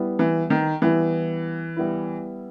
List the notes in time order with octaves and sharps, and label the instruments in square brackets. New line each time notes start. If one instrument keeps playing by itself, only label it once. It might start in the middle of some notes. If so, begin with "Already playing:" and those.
Already playing: [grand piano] G3 B3 E4
[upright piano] E3
D#3
[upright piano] E3 [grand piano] G3 B3 E4
[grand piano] G3 B3 E4